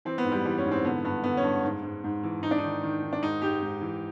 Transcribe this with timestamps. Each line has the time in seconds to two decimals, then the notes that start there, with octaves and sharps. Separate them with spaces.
0.05 E3 C4
0.18 B3
0.25 G#2
0.31 G3
0.45 E3 G3
0.58 C#4
0.65 G#2
0.71 C4
0.85 D3 B3
1.04 G2 B3
1.24 D3 B3
1.37 C#4
1.44 G2
1.64 G#2
1.83 G#2
2.04 G#2
2.23 E3
2.43 G#2 D#4
2.51 D4
2.58 D#3 D#4
2.83 D#3
3.02 D#3
3.13 D4
3.22 G#2 D#4
3.42 G#2 G4
3.62 G#2
3.81 E3